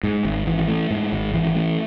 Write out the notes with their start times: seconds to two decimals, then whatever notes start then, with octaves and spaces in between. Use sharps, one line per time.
0.03 G#2
0.25 G#1
0.47 E3
0.68 A3
0.91 G#2
1.12 G#1
1.34 E3
1.55 A3